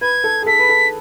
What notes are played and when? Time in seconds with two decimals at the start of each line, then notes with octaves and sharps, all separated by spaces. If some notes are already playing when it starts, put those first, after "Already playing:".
0.01 B4 G#6
0.24 A4
0.42 G#4
0.46 A4 B6
0.59 B4
0.69 A4